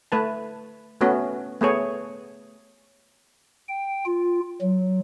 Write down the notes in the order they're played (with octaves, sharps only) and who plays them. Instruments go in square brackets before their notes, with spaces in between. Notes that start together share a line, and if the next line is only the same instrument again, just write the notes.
[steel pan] A3 B4 A5
A3 B3 C#4 F#4
A3 B3 G#4 C#5
[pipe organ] G5
F4
F#3